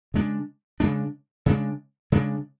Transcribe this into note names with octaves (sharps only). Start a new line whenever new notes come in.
C#3 G#3 D4
C#3 G#3 D4
C#3 G#3 D4
C#3 G#3 D4